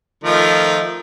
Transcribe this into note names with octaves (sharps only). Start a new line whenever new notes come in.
D#3 F3 A3